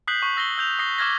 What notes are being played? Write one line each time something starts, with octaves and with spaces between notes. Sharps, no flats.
D#6 F#6 G6 B6 C7 F#7
C#6
E6 A#6 C7 G7
E6 G6 F7
D#6 A#6 C7 G7
D6 E6 F6 G#6 A#6